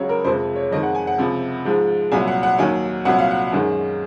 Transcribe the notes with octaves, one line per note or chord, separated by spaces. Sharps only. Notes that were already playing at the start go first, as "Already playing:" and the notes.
Already playing: C#2 C#3 F#3 C#5
A#4
F2 C3 F3 G#3 C5
C#5
F2 D#3 G#3 D#5
F#5
G#5
F#5
C#2 C3 F3
G#2 F3 G#3
C2 A#2 F#3 G#5
F#5
F#5
D#2 D#3 F#3 G#5
C2 A#2 F#3 F#5
F5
F#5
F#2 D#3 G#3